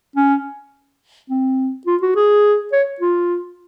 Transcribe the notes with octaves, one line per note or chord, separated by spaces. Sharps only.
C#4
C4
F4
F#4
G#4
C#5
F4